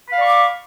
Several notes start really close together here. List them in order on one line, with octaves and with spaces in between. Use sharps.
B5 F5 D5 C#6 D6